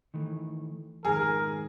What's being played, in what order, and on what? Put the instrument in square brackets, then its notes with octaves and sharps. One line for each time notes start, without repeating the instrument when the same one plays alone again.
[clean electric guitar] D#3 E3 A3
[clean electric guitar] F2 G#2 D#3 [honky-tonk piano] G#4 [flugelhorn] A#4